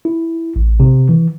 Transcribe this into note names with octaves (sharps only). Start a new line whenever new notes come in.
E4
A1
C3
E3